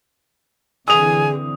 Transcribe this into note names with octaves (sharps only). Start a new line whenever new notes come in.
D3 E3 C4 G#4 G#5 D#6 F7